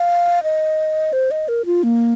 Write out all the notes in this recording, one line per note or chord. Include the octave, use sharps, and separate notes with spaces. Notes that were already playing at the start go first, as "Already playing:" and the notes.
Already playing: F5
D#5
C5
D#5
A#4
F4
A#3